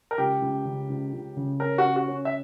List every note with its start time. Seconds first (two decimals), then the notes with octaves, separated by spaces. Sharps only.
0.11 A#4
0.18 C#2 G4
0.41 C#2
0.65 C#3
0.90 C#2
1.13 C#2
1.37 C#3
1.60 C#4 A#4
1.78 F#4
1.84 C#4
1.96 F#4
2.08 C#4
2.25 E5